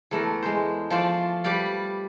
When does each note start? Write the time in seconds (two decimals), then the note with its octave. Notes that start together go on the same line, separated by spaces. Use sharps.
0.11 E2 A3 A#4
0.43 G#3 C5
0.90 F3 A3 F4 C5 D5
1.44 G3 G4 B4 D5 F5